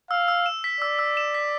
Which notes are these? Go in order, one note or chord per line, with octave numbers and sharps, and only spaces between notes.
F5 E6
E6
E7
B6
D5 E6
E6
E7
B6